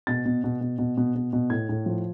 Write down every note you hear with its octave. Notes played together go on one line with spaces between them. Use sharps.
B2 A6
B2
B2
B2
B2
B2
B2
B2
A2 G#6
A2
F3